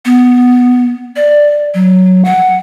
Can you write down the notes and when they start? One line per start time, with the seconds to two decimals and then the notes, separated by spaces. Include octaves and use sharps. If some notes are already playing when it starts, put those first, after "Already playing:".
0.05 B3
1.16 D5
1.74 F#3
2.25 F#5